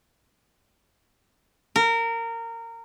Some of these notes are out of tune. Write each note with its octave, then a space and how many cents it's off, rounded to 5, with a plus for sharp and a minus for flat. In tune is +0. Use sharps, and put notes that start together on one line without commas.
A#4 -20